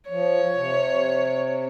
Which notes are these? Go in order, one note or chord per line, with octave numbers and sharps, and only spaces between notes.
F3 C#5
C3